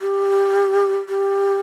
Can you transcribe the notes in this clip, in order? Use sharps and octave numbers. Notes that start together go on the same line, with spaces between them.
G4
G4